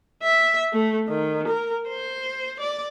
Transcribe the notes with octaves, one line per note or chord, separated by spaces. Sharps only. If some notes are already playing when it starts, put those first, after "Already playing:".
E5
A3
D#3
A#4
C5
D5